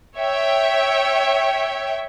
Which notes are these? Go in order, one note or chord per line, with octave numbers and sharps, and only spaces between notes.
C#5 E5 G5